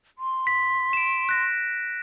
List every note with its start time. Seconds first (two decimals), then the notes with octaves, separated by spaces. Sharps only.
0.18 C6
0.47 B6
0.93 D7 E7
1.29 F#6 A#6